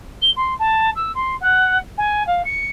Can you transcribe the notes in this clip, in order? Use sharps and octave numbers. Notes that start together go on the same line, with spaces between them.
G7
C6
A5
E6
C6
F#5
G#5
F5
C#7